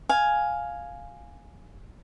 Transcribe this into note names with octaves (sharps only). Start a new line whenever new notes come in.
F5 G#5